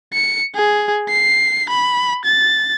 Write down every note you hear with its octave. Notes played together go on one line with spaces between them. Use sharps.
C#7
G#4
C7
B5
A6